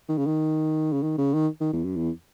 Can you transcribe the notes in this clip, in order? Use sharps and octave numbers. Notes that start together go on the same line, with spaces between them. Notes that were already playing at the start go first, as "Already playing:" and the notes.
D#3
C#3
D#3
C#3
D#3
C#3
D#3
D#3
E2
F#2
E2